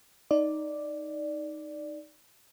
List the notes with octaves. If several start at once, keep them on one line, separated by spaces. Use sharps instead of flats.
D#4 D5